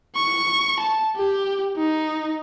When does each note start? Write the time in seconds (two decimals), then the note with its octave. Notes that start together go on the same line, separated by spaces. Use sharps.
0.16 C#6
0.80 A5
1.16 G4
1.77 D#4